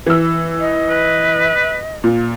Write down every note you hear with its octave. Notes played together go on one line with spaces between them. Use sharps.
E3 E6
D#5
B4
A#2